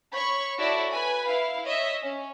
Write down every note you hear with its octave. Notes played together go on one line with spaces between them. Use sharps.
C#5 B5 C#6
E4 F#4 A4 C#5 D5
B4 G#5 B5
E4 F5
C#5 D#5 E5
C#4